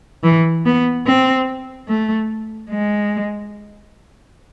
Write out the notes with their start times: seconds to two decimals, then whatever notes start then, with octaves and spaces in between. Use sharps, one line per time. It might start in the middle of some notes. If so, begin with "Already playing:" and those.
0.23 E3
0.65 B3
1.07 C4
1.88 A3
2.70 G#3